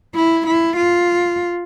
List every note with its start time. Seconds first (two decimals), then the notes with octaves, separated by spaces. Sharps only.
0.15 E4
0.47 E4
0.77 F4